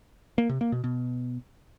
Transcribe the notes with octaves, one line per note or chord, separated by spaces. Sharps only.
A#3
C3
A#3
B2
B2